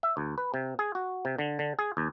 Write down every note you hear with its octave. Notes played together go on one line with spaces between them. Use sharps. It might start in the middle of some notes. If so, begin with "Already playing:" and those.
E5
D2
B4
C3
G#4
F#4
C3
D3
D3
G#4
D#2